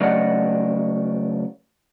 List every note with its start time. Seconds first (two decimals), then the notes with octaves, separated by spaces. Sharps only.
0.01 C#3 F#3 A3 D5 D#5 F#5